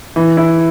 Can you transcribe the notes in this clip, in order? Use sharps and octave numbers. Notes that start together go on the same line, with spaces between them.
E3
E4